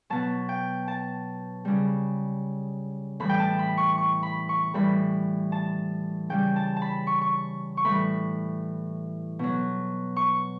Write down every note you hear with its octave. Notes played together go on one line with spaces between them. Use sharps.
B2 F#3 A5
G5
A5
C#3 G3
A2 E3 G3 B5
G5
A5
B5
C#6
C#6
B5
C#6
A2 E3 G3 B5
A5
C#3 G3 G5
A5
A5
B5
C#6
C#6
C#6
A2 E3 G3 B5
B2 F#3
C#6